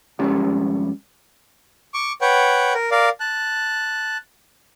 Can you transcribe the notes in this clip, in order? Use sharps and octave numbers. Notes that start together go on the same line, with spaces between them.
F2 G3 G#3 C#4 G4 F#5
C#6 D6
B4 C#5 F#5 G5
A#4
A#4 D5 F5
A5 F#6